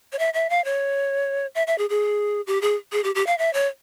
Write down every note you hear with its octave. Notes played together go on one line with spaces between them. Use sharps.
C#5
E5
E5
F5
C#5
E5
E5
G#4
G#4
G4
G#4
G#4
G4
G4
F5
E5
C#5